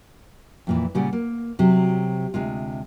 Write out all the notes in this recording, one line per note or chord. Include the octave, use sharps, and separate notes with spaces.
F2 A#2 E3
A#2 C#3 G3 C#4 D5 F#5
A#3
C3 F#3
D2 C3 G#3 F4